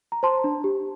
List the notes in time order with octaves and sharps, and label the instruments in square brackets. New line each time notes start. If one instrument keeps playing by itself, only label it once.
[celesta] A#5
C5 A5 C6
D4
G4